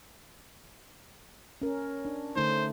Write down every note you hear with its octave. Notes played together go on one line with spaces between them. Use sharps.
C#4 A#4
D4
D3 A3 D#4 C5